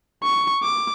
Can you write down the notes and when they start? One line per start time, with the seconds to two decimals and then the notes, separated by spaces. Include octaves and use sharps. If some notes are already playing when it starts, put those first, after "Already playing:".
0.23 C#6
0.63 D6